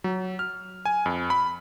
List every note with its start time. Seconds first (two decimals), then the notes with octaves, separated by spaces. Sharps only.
0.04 F#3
0.39 F6
0.85 G#5
1.06 F2
1.30 B5